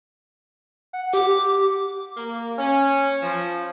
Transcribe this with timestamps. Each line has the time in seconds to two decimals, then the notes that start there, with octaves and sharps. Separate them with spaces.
0.93 F#5
1.14 G4 D6
2.17 A#3
2.58 C#4
3.23 F3